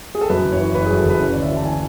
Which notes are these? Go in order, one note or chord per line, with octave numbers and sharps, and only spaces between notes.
G#4
A4
F#2 B4
F#1
C#5
E3
F#1 B4
G#4
F#2
A4
F#1 B4
C#3 C#5
D5
D2
E5
E3
A5
G#5